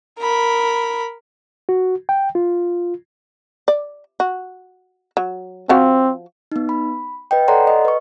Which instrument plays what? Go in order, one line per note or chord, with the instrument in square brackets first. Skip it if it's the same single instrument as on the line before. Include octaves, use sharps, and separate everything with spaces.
[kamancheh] A#4 B5
[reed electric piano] F#4
G5
F4
[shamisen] D5
F#4
F#3
[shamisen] F3 F#4 F5 [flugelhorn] C4
[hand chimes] B3 D#4
B5
B4 D#5 G5
A4 C#5 D5 F#5 A#5 C6
D#5
B4 C#6